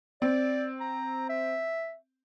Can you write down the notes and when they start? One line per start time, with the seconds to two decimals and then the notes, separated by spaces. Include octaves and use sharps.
0.22 C4 D5
0.80 A#5
1.29 E5